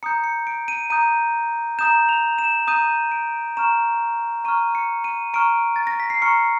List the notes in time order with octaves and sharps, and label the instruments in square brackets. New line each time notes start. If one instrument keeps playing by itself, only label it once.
[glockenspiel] A#5 D#6 G6 C#7
C#7
D7
D#7
A#5 D#6 G6 D#7
A#5 D#6 G6 E7
F7
E7
A#5 D#6 G6 D#7
D7
A#5 C#6 F6 E7
A#5 C#6 F6 D#7
C#7
D#7
A#5 C#6 F6 D7
A6
A#6
B6
C7
A#5 C#6 F6 C#7